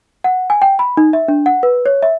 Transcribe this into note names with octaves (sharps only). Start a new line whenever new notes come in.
F#5
G#5
G5
B5
D#4
E5
D4
F#5
B4
C#5
E5